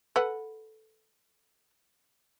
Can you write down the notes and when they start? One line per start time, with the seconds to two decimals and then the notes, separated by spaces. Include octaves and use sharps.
0.16 A4 B4 F#5